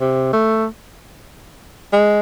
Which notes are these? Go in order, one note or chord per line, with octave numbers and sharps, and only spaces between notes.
C3
A3
G#3